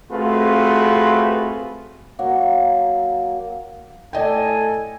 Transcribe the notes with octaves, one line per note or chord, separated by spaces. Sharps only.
A3 C4 F4 F#4 G#4 B4
F#3 A#3 A#4
A2 A4 D5 D#5 G5 G#5